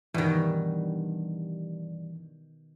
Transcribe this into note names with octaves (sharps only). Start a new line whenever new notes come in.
G2 B2 D#3 E3 G3